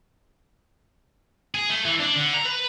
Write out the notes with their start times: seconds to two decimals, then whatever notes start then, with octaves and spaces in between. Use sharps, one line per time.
1.54 G#4
1.70 A3
1.85 E3
2.00 D4
2.16 D3
2.34 A#5
2.45 B4